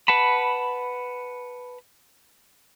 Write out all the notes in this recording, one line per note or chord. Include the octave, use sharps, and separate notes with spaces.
B4 F#5 A5 B5